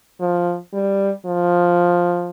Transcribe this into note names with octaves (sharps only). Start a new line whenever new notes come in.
F3
G3
F3